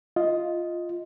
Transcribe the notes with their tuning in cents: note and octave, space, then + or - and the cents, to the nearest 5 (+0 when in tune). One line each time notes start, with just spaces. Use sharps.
F4 +0 D#5 +5